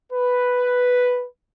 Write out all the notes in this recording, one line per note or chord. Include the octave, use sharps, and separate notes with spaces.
B4